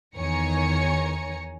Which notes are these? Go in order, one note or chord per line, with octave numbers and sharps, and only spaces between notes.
E2 D#3 C#5 G#5 A#5 C#7